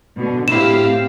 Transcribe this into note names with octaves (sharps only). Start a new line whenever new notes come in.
B2 D3
A2 C4 E4 G4 F5 E7